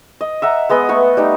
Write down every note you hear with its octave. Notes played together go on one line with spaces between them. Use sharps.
D#5
E5 F#5 A#5
G#3 B3 D#5 B5
A3 B3 F#5 C#6
G3 A3 D#4